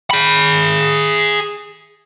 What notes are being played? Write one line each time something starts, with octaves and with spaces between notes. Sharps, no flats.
G#4 B5